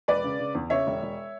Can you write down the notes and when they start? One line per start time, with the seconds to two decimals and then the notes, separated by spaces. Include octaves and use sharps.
0.08 E1 B4 D5
0.24 C#3
0.40 C#3
0.55 E2
0.70 C#3 C#5 E5
0.87 E1
1.02 E1